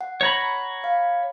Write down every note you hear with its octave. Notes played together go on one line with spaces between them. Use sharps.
F#5
C#5 A#5 B5
F5